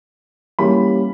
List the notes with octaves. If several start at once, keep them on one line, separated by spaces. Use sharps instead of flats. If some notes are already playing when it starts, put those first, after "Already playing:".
E3 G3 A#3 C#4 B5